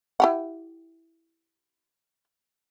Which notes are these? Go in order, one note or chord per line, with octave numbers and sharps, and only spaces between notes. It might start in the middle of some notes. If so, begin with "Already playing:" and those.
E4 G4 F#5